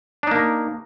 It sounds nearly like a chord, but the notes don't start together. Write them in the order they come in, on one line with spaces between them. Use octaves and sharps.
D4 D#4 A#3